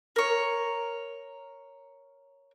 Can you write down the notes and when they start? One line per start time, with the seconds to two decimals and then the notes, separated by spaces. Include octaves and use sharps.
0.16 A#4 C#5